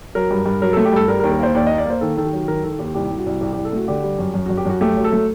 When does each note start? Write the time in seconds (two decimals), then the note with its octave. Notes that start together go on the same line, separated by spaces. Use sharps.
0.15 F#3 A#4
0.31 G2
0.46 G2
0.62 F#3 A#4
0.73 A3 A4
0.85 G4
0.93 G2 A4
1.08 G3 A#4
1.20 A#4
1.24 D#2
1.32 A#4
1.39 A#3 C5
1.55 D#2 D5
1.67 A#3 D#5
1.78 D5
1.86 A#3 C5
2.01 D#3 A4
2.17 D#3 A4
2.24 G4
2.32 F#3
2.48 D#3 A#4
2.64 D#3 A4
2.79 D#2 G4
2.94 C2 G4
3.11 C2
3.18 F#4
3.26 C2
3.41 C2 G4
3.53 C2 G4
3.65 A4
3.72 A3 F#4
3.88 D3 G4
4.03 G3
4.19 F#2
4.34 F#2
4.46 F#2 F#4
4.57 G4
4.65 F#2 F#4
4.81 A3 G4
4.97 F#3
5.04 A4
5.12 A3